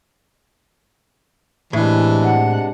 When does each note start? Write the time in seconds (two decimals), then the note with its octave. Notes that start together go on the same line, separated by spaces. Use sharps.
1.73 A2 C3 E3 G#3 D4
2.24 F#5